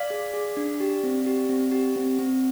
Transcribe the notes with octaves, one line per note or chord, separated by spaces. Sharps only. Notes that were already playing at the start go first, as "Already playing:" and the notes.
Already playing: D5 F5
G#4
G#4
D4
G4
C4
G4
C4
G4
C4
C4